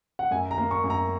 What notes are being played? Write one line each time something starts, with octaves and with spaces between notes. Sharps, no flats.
F#5
F#2 G#5
A#5
A#3
C#6
F#2
A#5